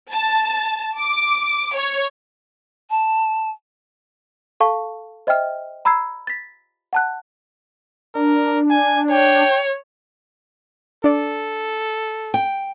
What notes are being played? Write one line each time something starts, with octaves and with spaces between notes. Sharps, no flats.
A5
D6
C#5
A5
A4 F5 A5 C#6
C5 D#5 E5 G5 F6
A#5 B5 E6 G#6 C7
A6 B6
F#5 A5 F#6
D4 A#4
G#5
C#5 G5
D4 A4 D5
G5